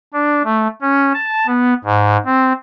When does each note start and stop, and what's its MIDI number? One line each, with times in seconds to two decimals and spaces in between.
0.14 0.43 62
0.45 0.68 57
0.82 1.13 61
1.14 1.47 81
1.47 1.74 59
1.84 2.17 44
2.26 2.53 60